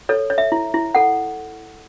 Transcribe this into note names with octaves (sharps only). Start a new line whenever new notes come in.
A4 C#5
C#5
E5
E4
E4
A4 F#5